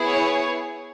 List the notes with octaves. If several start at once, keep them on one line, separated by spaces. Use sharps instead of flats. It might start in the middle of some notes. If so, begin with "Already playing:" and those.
Already playing: B3 E4 G#4
C#5